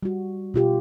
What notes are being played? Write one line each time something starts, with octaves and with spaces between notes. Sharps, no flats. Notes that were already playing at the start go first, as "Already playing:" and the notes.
G3 F#4
B2 F4 G4